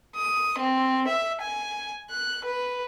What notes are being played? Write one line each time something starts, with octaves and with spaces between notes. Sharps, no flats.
D#6
C4
E5
G#5
F#6
B4